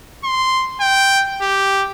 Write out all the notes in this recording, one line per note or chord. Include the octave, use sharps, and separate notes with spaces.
C6
G5
G4